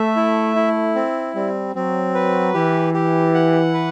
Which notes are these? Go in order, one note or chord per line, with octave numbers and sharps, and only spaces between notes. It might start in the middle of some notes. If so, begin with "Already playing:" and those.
Already playing: A3 E5
E4
E4
C4
G3 C4
F#3 C4
B4
E3 G4
G4
F#5
B4